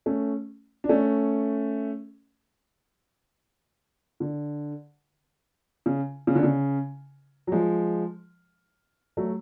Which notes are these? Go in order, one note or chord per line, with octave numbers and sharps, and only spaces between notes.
A3 C#4
D4
A3 C#4
D3
C#3
C#3
D3
C#3
F#3
F3 G#3
F#3 A3